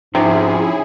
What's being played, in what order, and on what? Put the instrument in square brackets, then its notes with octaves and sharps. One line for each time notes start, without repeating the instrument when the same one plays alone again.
[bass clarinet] G#2 [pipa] C3 [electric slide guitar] F3 C#4 [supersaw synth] E4 G#4